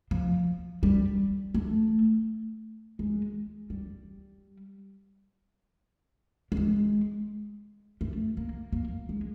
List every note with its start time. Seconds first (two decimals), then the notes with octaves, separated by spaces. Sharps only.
0.11 F3
0.83 G3
1.54 A3
2.99 G#3
3.70 G3
6.52 G3
6.57 G#3
8.01 A3
8.37 A#3
8.73 A#3
9.09 G#3